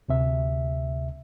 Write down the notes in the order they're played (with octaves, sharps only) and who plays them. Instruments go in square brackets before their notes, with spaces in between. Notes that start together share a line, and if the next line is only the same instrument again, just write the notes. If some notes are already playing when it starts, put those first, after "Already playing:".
[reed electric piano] D2 C3 E5